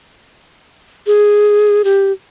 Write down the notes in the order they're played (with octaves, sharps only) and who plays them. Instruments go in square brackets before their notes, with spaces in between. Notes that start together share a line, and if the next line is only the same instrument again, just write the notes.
[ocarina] G#4
G4